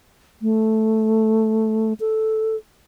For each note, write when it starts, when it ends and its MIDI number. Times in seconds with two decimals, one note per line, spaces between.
0.42 1.93 57
2.00 2.56 69